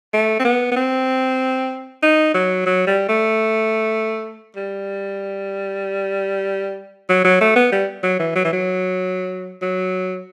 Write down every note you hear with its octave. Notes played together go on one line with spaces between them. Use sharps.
A3
C4
B3
B3
C4
D#4
F#3
F#3
G3
A3
G3
F#3
F#3
A3
B3
G3
F#3
E3
F#3
E3
F#3
F#3